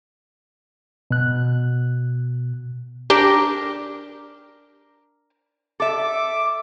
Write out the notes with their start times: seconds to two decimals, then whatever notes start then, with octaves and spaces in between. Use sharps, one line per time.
1.11 B2 F#6
3.10 D4 G4 A#4
5.80 A4 E5 D6